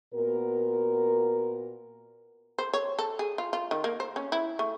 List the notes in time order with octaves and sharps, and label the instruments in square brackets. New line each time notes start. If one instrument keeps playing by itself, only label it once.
[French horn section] A#2 B3 F#4 A#4
[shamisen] C5
C#5
A4
G#4
F4
F4
D#3
A#3
C5
C#4
E4
A3